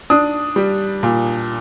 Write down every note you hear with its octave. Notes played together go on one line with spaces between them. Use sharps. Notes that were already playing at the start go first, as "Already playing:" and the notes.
D4 D#6
G3
A#2